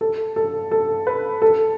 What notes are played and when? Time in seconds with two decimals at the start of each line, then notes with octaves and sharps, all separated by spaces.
0.01 A4
0.36 A4
0.71 A4
1.07 B4
1.42 A4